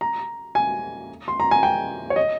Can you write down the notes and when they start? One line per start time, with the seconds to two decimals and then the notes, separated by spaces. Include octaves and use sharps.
0.01 A#5
0.55 G#5
1.28 C6
1.40 A#5
1.51 G#5
1.63 G5
2.10 C#5
2.16 D#5